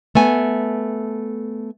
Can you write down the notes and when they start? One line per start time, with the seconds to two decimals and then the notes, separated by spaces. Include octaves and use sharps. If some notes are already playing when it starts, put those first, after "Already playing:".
0.15 A3 B3 G#5